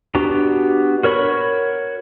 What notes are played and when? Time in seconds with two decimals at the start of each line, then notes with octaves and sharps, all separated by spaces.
0.15 B3 D4 F#4 G4 A#5
1.03 F#4 A#4 C#5 B5 C#6